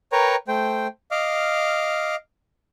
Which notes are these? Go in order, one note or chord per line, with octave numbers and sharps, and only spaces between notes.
A#4 B4 C#5 G5 A#5 C#6
A3 C5 G5
D#5 F5 D6 F6